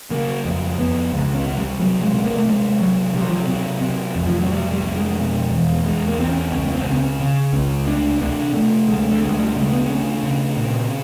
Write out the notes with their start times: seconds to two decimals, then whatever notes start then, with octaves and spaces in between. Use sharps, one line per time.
0.10 C#3 A#3
0.45 F2
0.78 F2 B3
1.12 C#2
1.34 C#4
1.46 C3
1.57 G3
1.79 C3 F#3
2.02 G#3
2.14 C3
2.25 A#3
2.37 A3
2.47 C3 G#3
2.81 C3 F#3
3.15 C3 G3
3.22 F#3
3.30 F3
3.36 F#3
3.48 C3
3.82 C3
4.16 F2
4.26 F3
4.38 F#3
4.49 C3 G3
4.72 G3
4.83 F2
4.95 G#3
5.17 B2
5.51 E2
5.84 E2 G#3
6.08 A#3
6.18 E2 C4
6.29 C#4
6.52 C#2 C#4
6.65 C#4
6.75 C4
6.86 C#3
6.92 C4
6.97 C#4
7.20 C#3
7.53 C#2 C#4
7.87 D2 D4
8.21 C3 D4
8.54 C3 A3
8.88 D2 G#3
9.12 A3
9.22 D2 G#3
9.39 G3
9.56 C#3 G#3
9.73 B3
9.89 D2 C#4
10.23 C#3
10.57 A#2